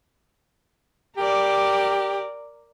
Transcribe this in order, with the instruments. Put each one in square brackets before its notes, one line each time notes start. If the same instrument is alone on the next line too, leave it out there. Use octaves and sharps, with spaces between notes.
[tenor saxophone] G4 [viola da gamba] A#4 D5